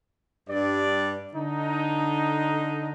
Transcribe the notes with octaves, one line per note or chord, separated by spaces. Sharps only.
G2 D5
D3 D#4